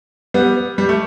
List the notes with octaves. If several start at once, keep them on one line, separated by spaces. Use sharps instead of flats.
G3 B3
G3
A3